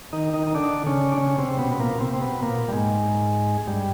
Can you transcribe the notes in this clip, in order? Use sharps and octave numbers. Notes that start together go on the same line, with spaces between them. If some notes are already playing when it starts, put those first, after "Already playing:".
D#3 D#4
D#3 D#4
D#4
D3 D4
C#3 C#4
D4
C#3 C#4
C3 C4
B2 B3
B3
A#2 A#3
C3 C4
C4
B2 B3
A#2 A#3
G3
G#2 G#3
G2 G3